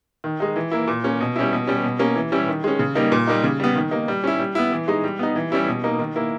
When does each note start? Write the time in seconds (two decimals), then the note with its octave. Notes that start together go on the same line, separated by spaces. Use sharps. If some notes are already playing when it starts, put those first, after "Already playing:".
0.24 D#3
0.40 G#3 D#4
0.56 E3
0.71 A#3 E4
0.87 A#2
1.04 A#3 C#4
1.21 B2
1.36 G3 C#4 E4
1.53 B2
1.67 G3 C#4
1.83 B2
1.99 A#3 C#4
2.16 E3
2.32 G3 C#4 E4
2.48 D#3
2.64 G#3 C#4
2.79 C#3
2.95 G3 A#3 D#4
3.12 A#2
3.27 G3 A#3 D#4
3.44 C#3
3.60 G3 B3
3.76 D#3
3.91 A#3 D#4
4.08 G3
4.24 C#4 E4
4.39 G3
4.55 B3 E4
4.72 E3
4.88 G#3 D#4
5.04 G3
5.19 B3 D#4
5.35 E3
5.52 G3 C#4 E4
5.68 B2
5.84 A#3 D#4
5.99 D#3
6.16 A#3 E4